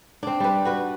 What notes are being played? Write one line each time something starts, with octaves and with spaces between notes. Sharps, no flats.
C4 D4
G3 B4
F#4 B4